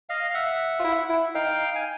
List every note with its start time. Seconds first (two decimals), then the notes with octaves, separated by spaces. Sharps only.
0.09 D#5 F5
0.30 F5
0.34 E5 F#5
0.80 F4
0.85 E4
1.10 E4
1.35 D#4 F5 G5
1.75 G#5